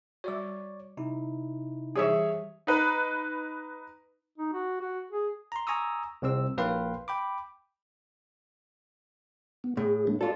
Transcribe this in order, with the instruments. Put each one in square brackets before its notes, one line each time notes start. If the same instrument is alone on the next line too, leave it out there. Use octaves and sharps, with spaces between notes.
[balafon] G3 F#4 [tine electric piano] C#5 D5 D6
[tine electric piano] C3 D#4 E4
[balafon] E3 G3 G4 [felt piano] G#4 C#5 E5
[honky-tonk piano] D#4 B4
[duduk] D#4
F#4
F#4
G#4
[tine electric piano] A#5 C6
G#5 A#5 C#6 D#6 E6
C2 C3 C4 E6
A#1 A#3 B4 F5 G5 C6
G5 B5 D6
[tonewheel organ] B3
[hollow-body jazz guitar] A2 [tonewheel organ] G#4
[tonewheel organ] G#3 A#3 D4
[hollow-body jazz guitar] F4 A4 [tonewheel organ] F#4 D5